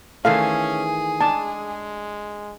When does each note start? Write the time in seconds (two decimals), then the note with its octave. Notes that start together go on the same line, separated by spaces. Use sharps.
0.25 D#3 E3 A3 C#4 G#4 F5
1.21 G#3 D4 A5